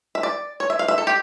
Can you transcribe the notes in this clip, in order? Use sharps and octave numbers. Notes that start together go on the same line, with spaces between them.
E5
D5
C#5
E5
F5
E5
A4
G4